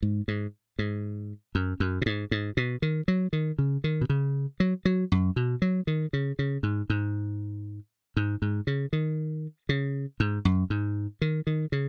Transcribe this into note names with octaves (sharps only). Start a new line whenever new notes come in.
G#2
G#2
G#2
F#2
F#2
B2
G#2
G#2
B2
D#3
F#3
D#3
C#3
D#3
B2
C#3
F#3
F#3
F#2
B2
F#3
D#3
C#3
C#3
G#2
G#2
G#2
G#2
C#3
D#3
C#3
G#2
F#2
G#2
D#3
D#3
C#3